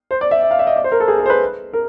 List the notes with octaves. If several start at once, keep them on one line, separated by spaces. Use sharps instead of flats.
C5
D5
E5
E5
F5
E5
D#5
D5
C5
A#4
A4
G#4
A4
C5
B4
A#4